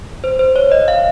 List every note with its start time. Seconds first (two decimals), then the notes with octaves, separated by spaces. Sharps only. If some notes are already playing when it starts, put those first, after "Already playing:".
0.24 C5
0.39 C5
0.56 C#5
0.72 D#5
0.88 F5